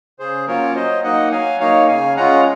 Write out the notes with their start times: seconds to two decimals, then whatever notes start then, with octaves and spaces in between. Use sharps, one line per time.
0.19 C#3 G#4 C5
0.47 F#3 A#3 C#4 F4 A#4 C#5
0.75 F#3 C5 D#5
1.03 A#3 D#4 D#5 F#5
1.31 F#3 F5 G#5
1.60 A#3 D#4 C#5 F5
1.88 C#3 F5 G#5
2.16 G#3 C#4 F4 F#5 A#5